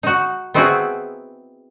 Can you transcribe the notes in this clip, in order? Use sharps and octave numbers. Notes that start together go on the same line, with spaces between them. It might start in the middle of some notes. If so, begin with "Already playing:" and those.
D#4 F#4
B3 C4 D#4 E4 F#4 G#4